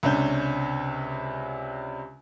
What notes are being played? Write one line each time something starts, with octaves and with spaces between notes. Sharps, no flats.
C#2 C3 C#4 D4 G6